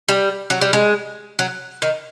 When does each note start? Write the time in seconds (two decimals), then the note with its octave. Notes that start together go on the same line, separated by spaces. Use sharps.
0.08 G3
0.50 F#3
0.61 G3
0.73 G#3
1.39 F#3
1.82 D#3